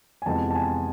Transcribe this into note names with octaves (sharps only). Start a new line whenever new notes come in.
G#5
F2 C3 E3 G#3 B3 A5
A5
G#5